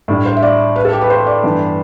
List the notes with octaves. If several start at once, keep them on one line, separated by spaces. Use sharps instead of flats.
A2 G3 D4
C5
E5
D5
B4
A4
G4
B4
C5
D5
G2 E3 B3 D4